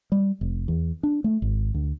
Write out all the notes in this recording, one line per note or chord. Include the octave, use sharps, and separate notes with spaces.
G3
F1
E2
D4
A3
G#1
D2